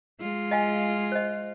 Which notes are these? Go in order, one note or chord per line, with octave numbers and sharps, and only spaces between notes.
G#3 F4
D#5 F5 G#5
C5 D#5